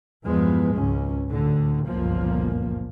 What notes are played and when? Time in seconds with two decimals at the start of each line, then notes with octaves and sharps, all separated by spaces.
0.25 E2 G2 E3 F3 G#3 B3
0.76 G#1 C#2 G#2 C#4
1.30 D2 A2 D3
1.87 G1 C#2 F#2 A#2 F3 A#3